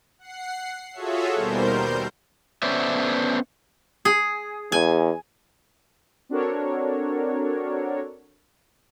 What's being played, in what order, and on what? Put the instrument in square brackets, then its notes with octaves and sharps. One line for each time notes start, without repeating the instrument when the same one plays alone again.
[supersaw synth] F#5 C7
F4 F#4 G#4 A4 C#5 E5
D#2 B2 G3 A#4 C5 G6
[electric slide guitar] A3 B3 C#4 C5 D5 E5
[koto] G#4
[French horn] E2 [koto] G#5
[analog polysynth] C4 D4 F#4 A4 A#4 C#5